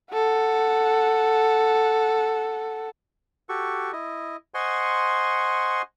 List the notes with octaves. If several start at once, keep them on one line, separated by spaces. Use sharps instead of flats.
A4 F#5
F#4 G4 A4 C#6
E4 D#5
C5 D#5 F#5 G#5 C6 C#6